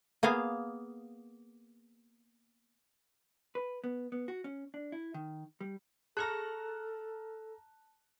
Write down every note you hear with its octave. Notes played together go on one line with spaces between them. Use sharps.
A#3 B3 G#4 F5
B4
B3
B3
F#4
C#4
D4
E4
D#3
G3
G#4 A4 A5 A#5 C#6 F6 F#6 A#6